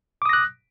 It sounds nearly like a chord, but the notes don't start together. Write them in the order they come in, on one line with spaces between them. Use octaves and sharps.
D6 D#6 A#6 F#6